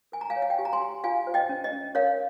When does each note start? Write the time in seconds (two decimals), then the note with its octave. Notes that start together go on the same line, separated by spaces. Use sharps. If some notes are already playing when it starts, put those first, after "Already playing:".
0.12 A#4 G#5
0.21 A#5
0.30 F5 G#5
0.36 C#5
0.42 F5
0.50 G5
0.58 G4 G#5
0.65 A#5
0.73 G#5 C6
0.81 G4
1.04 F4 F5 G#5
1.27 C5
1.34 D#5 G5
1.49 C#4
1.64 D#5
1.73 C#4
1.95 A#4 C#5 F5